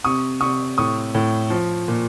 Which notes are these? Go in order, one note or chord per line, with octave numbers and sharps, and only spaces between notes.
C3 C#6 D#6
C3 C#6 D#6
A2 C#6 D#6
A2
F3
A#2